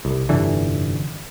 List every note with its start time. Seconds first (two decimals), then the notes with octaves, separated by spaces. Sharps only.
0.05 C2
0.29 F1 G2 D3 E3